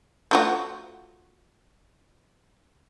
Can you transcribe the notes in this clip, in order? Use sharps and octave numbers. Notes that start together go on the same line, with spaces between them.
A3 F4 F#4